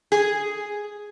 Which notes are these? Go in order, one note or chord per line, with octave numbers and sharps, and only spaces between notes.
G#4